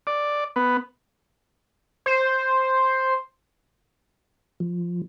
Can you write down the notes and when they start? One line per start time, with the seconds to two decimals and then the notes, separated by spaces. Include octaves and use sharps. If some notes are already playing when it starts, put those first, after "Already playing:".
0.07 D5
0.56 B3
2.06 C5
4.60 F3